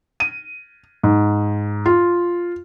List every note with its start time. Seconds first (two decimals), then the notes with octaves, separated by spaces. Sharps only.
0.20 D#7
1.03 G#2
1.86 F4